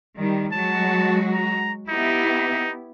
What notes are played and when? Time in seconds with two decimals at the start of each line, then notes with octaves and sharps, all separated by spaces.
0.17 D#3 G3
0.52 F#3 G#3 F#4 A5
1.33 A#5
1.89 B3 D#4 E4 G4